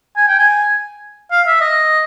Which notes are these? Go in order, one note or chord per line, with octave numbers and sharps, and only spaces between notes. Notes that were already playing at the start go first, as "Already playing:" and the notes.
G#5
G5
G#5
F5
E5
D#5